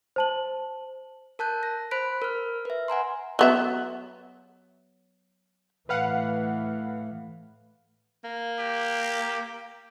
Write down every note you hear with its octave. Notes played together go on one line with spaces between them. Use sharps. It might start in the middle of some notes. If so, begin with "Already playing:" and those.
C5 A5 F#7
A#4 A5 F#6 G6
A#6
C5 B5 F#6 B6 D7
A#4 F6
B4 E5
F#5 G#5 A#5 C6
F#3 B3 E5
A2 E3 B4 F5 F#5
A#3
G4